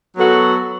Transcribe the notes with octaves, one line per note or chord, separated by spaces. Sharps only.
F#3 B3 F#4 A4